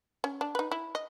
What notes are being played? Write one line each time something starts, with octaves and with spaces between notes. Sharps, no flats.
C#4
D4
D#4 B4
E4
D#5